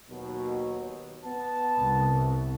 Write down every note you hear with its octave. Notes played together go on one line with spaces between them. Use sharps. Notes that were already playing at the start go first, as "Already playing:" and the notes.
D#2 B2 F#3
B3 A5
C2